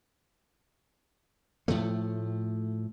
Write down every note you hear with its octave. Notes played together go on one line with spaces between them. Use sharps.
A2 F3 A3